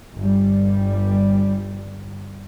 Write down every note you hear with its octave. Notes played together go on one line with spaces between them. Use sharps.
G1 G3